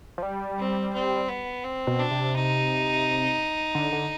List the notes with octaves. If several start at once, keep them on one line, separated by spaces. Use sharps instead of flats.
F3
G3
C4
C4
B3
C4
B2
D4
C3
D#4
D3
D3